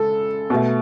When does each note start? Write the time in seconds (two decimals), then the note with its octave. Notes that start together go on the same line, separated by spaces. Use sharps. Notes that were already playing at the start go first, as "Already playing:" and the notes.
Already playing: C#3 G#3 A4
0.50 B2 A3